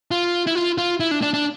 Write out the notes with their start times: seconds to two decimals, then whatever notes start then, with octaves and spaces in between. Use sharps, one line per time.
0.11 F4
0.47 E4
0.55 F4
0.78 F4
1.00 E4
1.11 D4
1.22 D4
1.34 D4